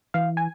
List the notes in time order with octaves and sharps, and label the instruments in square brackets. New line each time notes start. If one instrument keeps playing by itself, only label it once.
[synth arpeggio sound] E3 F5
G#5